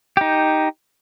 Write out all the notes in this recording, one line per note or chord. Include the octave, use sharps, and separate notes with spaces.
D#4 G4